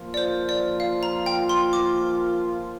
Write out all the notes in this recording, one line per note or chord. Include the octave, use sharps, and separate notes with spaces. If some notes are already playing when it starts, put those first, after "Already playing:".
Already playing: F3 A#3 F4
D5
C5
D5
F5
A#5
G5
C6
D6